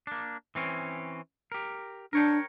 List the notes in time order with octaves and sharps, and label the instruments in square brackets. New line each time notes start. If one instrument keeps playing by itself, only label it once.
[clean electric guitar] A#3 D4
E3 C4 C#4
G4 A#4
[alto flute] D4 [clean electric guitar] A#4 C#5 G5